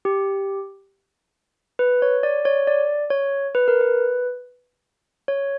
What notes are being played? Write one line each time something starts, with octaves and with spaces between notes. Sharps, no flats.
G4
B4
C#5
D5
C#5
D5
C#5
B4
A#4
B4
C#5